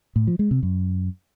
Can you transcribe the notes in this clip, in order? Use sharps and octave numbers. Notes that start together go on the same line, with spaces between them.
A2
F3
G#3
C3
F#2